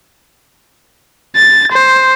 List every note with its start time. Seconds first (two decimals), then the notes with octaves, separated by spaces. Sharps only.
1.36 A6
1.72 C5